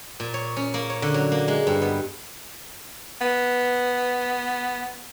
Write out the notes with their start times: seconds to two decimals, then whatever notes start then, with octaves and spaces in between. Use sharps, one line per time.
0.20 A#2
0.34 C#5
0.56 C#4
0.74 A#3
0.90 C#5
1.02 D3
1.14 F#3
1.32 A#3
1.48 G#3
1.67 G2
1.82 B3
3.21 B3 B4